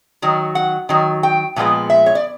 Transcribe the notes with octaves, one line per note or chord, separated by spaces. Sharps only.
D#3 F#3
F#5
D#3 F#3
G5
A#2 F3 G#3 B3
E5
C#5
D5